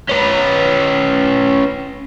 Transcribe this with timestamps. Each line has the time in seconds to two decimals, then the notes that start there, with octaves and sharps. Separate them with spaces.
0.09 C#4 B4